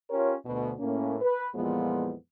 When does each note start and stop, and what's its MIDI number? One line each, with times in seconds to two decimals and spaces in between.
0.10 0.34 61
0.10 0.34 65
0.10 0.34 67
0.10 0.34 70
0.10 0.34 73
0.46 0.73 38
0.46 0.73 47
0.79 1.15 45
0.79 1.15 58
0.79 1.15 61
1.22 1.47 71
1.55 2.14 41
1.55 2.14 46
1.55 2.14 52
1.55 2.14 53
1.55 2.14 56
1.55 2.14 59